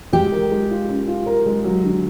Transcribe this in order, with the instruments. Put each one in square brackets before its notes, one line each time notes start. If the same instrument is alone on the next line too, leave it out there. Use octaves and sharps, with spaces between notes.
[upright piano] G#3 [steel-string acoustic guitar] G4
[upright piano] A#4
G#3
F4
C#4
F4
A#4
G#3
F#3
D3